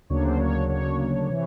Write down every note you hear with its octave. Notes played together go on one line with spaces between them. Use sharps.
D2 C#3 F#3 A#3 D4 C#5
C5
C#5
C#5
C3 E3